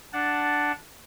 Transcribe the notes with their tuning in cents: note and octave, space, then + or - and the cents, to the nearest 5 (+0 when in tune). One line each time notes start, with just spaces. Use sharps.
D4 +0 F#5 +0 A5 +0